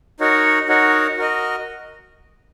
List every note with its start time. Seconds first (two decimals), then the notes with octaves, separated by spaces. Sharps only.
0.20 D#4 F#4 A#4 C#5 F#5
0.68 D#4 F#4 A#4 C#5 F#5
1.17 F#4 A#4 D#5